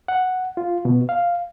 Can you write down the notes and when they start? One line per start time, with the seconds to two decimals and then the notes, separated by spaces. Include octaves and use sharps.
0.08 F#5
0.57 F4
0.85 B2
1.09 F5